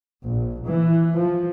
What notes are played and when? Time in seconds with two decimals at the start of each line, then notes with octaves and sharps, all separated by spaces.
0.23 A#1
0.68 E3
1.16 F3